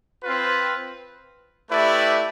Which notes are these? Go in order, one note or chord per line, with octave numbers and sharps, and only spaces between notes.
C4 F4 B4
A3 E4 G4 B4 D5